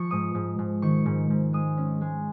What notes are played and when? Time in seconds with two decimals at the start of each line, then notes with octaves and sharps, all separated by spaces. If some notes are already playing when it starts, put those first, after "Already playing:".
Already playing: F3 C#6
0.11 G#2 D#6
0.35 G#2
0.59 G#2
0.82 D#3 C#6
1.06 G#2
1.30 G#2
1.53 G#3 D#6
1.77 C#4
2.01 G#3